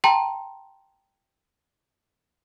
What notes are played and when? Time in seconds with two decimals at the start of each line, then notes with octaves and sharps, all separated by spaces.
0.04 G5 A5 A#5 C6